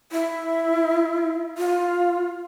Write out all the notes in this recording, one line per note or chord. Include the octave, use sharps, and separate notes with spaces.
E4
F4